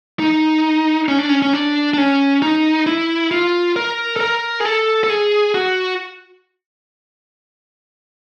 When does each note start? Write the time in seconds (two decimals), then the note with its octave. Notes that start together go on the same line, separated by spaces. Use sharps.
0.19 D#4
1.08 C#4
1.19 D4
1.29 C#4
1.42 C#4
1.53 D4
1.94 D4
1.98 C#4
2.42 D#4
2.86 E4
3.31 F4
3.76 A#4
4.16 A4
4.21 A#4
4.61 G#4
4.65 A4
5.04 A4
5.09 G#4
5.54 F#4